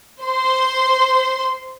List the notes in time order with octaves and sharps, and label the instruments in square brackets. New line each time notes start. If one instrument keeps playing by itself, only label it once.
[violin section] C5 C6